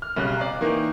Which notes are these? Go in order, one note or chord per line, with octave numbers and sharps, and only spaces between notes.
F6
B1 C#3 G3 F6 F#6
D5 D#5 F5 A#5
D#3 E3 A#3 D#4